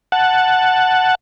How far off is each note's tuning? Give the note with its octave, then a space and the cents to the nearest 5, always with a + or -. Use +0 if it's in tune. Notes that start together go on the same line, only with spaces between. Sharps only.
F#5 +0 A5 +0